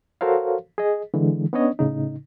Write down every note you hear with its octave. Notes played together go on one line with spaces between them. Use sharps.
F#4 A4 A#4 C5 C#5 F5
G#4 D#5
D3 E3 G#3
B3 C#4 D4 C#5 D#5
A2 C#3 D#4